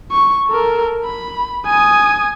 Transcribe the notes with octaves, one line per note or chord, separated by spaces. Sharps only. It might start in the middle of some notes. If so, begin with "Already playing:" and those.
C#6
A4 A#4
B5
G#5 D#6